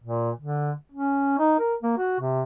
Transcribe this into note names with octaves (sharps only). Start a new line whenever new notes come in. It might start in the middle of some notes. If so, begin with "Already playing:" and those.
A#2
D3
C#4
D#4
A#4
A#3
F#4
C3